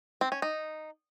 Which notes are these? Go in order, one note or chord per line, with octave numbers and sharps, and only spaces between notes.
C4
C#4
D#4